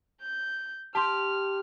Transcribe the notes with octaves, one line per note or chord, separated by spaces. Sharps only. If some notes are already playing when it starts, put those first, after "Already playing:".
G6
G4 A5 C6 F6